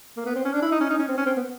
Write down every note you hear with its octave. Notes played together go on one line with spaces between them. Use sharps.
A#3
B3
C4
C#4
D4
E4
D#4
C#4
D#4
C#4
C4
C#4
C4
B3